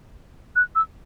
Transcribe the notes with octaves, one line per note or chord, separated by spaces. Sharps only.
F#6
E6